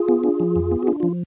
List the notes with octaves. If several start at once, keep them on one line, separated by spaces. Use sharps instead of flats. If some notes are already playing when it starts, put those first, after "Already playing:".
Already playing: F4 G#4
B3
D4
F3
F2
B3
F#4
D4 F4
F3 F4